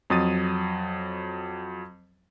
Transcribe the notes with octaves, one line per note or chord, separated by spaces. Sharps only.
F2 F#3 D#6 A6 D#7